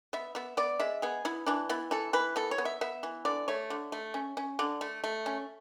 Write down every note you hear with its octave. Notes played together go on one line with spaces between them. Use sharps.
B3 E5
B3 E5
B3 D5
G#3 E5
B3 G#4
B3 E4
E3 D4
B3 E4
E3 A4
E3 B4
B3 A4
C#5
B3
E5
B3 E5
E3
D3 D5
A3 C#5
D3
A3
C#4
C#4
D3 D5
A3
A3
C#4